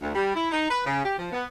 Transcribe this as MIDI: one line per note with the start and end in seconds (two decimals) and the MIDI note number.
0.01 0.11 38
0.15 0.32 55
0.35 0.49 64
0.51 0.67 63
0.70 0.81 71
0.85 1.05 49
1.05 1.15 67
1.18 1.31 53
1.32 1.45 59